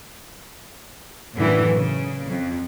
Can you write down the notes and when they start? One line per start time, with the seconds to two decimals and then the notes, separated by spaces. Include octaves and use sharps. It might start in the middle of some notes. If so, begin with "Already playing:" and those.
1.35 F#2 A2 D3 E3
1.75 C#3
2.27 F2